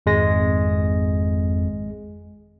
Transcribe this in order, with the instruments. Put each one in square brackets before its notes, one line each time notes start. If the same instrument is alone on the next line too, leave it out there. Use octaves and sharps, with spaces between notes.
[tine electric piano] G#1 G#3 A#6 [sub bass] F2